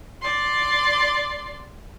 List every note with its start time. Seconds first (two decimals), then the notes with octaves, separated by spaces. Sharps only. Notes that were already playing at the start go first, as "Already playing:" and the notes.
0.22 D5 C6